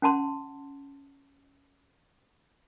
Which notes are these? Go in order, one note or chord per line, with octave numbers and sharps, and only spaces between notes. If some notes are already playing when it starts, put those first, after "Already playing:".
C#4 F#5 A5 C6